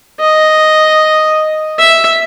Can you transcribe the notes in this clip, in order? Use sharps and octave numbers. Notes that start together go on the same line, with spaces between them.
D#5
E5